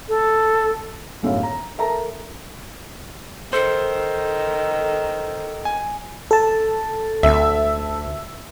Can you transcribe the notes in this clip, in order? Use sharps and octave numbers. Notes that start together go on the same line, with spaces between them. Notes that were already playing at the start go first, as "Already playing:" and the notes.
A4
G1 F#2 A2 C#5 F5
A#5
A4 A#4 E5 A5 A#5
D#3 A4 C5
G#5
A4 A5
D2 E5